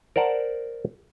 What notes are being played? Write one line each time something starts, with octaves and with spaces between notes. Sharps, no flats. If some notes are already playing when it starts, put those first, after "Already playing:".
A#4 C5 D5 F#5 A5